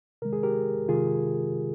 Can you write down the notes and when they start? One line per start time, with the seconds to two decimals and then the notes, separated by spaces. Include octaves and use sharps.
0.22 C3 D#3 G#3 A#4
0.33 G#4
0.43 G4 A#4
0.89 C3 D#3 G#3 F4 G#4